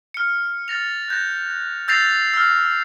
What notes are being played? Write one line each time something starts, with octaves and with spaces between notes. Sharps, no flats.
F6 C#7
F6 A6 A#6 F7
F#6 G6 A#6
E6 G6 A6 A#6 C7 F7
E6 F6